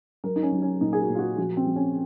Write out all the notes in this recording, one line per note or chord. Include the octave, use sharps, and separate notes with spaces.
F#3 A#4
D#4
C#4
F#3
C#4
A#2 D#4
G#4
F#4
A#2
F4
F#4
F3 F#4
C4
F3
C#4